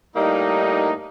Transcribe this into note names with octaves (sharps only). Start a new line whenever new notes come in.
A2 G3 A#3 D#4